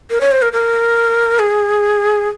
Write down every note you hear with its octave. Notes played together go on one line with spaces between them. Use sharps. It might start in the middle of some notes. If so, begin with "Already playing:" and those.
A#4
C#5
C5
A#4
A#4
G#4